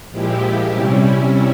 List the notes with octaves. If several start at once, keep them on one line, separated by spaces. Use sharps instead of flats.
A#2 F3 G#3 E4 G4
C3 G3 C#4 E4